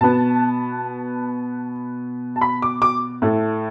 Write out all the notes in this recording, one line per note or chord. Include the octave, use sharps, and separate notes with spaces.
B2 B3 A5
A5
B5
D6
D6
A2 A3